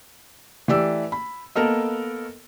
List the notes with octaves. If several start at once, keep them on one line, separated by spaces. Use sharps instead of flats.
E3 A3 G4 D5 E6
B5
A#3 B3 A4 A#4 D#5